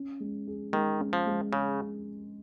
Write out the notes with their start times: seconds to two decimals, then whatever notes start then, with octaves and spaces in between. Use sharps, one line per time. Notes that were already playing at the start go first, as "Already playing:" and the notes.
Already playing: C#4
0.20 G#3
0.47 G#4
0.73 D#3 G#3
1.00 C#4
1.13 F3
1.27 G#3
1.53 C#3 G#4